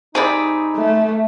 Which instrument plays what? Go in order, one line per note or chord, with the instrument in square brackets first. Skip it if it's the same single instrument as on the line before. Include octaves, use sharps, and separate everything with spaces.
[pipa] C3 C4 [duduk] D#4 [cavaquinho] G#4 D5 B5
[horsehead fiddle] A3